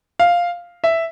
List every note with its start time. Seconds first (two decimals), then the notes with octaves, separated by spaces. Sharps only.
0.19 F5
0.84 E5